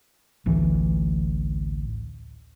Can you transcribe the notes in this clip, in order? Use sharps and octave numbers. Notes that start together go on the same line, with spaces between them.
A1 D2 E3